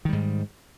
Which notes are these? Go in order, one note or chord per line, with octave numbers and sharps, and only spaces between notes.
G#2 D#3 G3